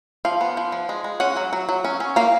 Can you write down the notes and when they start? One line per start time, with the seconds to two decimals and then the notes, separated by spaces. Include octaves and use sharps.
0.25 F3 F5
0.41 B3
0.57 F3
0.72 F3
0.89 G#3
1.04 G#3
1.20 C#4 F#5
1.37 F#3
1.53 F#3
1.69 F#3
1.84 C#4
2.00 C#4
2.16 A#3 F5